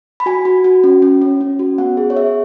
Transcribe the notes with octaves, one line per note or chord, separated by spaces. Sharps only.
B5
F#4 G#5
F#4
F#4
C#4
C#4
C#4
C#4
F#4
B3 F#5
G#4
C#5
G#4 E5